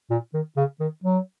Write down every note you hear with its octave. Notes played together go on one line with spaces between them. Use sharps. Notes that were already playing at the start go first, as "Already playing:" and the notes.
A#2
D#3
C#3
D#3
F#3